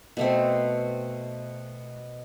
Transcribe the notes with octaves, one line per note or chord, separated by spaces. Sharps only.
B2 A3 C4